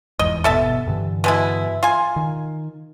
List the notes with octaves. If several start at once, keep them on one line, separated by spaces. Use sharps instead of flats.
F1 E2 G#2 D#5
G1 B2 A4 E5 A5
G2 D3 E3
B2 G#3 E4
F4 G#5
D#3